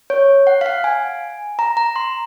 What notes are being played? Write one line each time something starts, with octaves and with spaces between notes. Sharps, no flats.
C#5
F#5
F5
F#5
G#5
A#5
A#5
C6